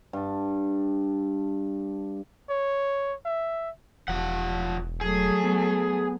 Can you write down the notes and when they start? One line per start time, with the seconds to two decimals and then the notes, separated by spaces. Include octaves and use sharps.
0.13 G2 A5
2.49 C#5
3.25 E5
4.08 E1 F3 F#5
5.01 F#3 A3 G#4
5.44 B3